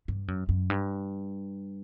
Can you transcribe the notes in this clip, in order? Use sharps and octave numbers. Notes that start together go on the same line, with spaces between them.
G2
F#2
F#2
G2